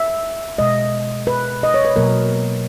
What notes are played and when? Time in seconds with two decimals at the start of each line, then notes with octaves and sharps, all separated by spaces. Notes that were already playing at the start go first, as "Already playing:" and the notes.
Already playing: E5
0.58 B2 G#3 D#5
1.27 B4
1.63 D#5
1.74 C#5
1.85 B4
1.96 B2 F#3 A#3 A#4